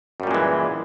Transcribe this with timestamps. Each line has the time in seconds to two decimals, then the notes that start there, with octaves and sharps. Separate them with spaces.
0.20 F#2
0.23 G3
0.27 A#2
0.31 G#3
0.34 E3